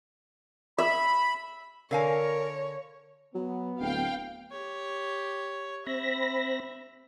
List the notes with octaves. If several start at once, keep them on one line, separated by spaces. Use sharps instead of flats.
E5 B5
D3 A#4 C#5 F5 G#5
F#3 B3
D1 F5 G5
G4 C#5
C4 E5 B5 A#6